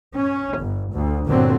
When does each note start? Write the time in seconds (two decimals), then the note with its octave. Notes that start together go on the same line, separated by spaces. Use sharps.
0.16 C#4
0.60 G1
0.93 D2
1.27 G1 A#2 D3 F#3 C4